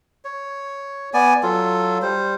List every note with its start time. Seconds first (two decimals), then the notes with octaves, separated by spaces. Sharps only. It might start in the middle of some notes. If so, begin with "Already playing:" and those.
0.25 C#5
1.14 B3 D5 G#5
1.43 F#3 F4 A4
2.02 G3 C5